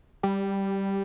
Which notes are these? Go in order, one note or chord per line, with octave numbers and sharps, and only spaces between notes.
G3